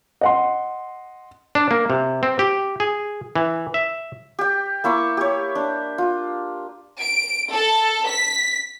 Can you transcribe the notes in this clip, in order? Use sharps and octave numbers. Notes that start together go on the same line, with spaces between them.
D#5 F#5 C6
D4
A#3
C3
C4
G4
G#4
E3
E5
G4 G5
A#3 E4 C#6 D6
G4 C#5
D4
F4
D7
A4
B6